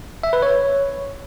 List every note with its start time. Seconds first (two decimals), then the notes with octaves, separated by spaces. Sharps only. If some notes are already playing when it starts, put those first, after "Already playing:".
0.23 E5
0.33 B4
0.42 C#5